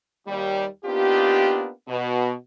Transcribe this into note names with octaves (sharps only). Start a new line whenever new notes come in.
D#2 G3
A#3 B3 D4 D#4 F4 G4
B2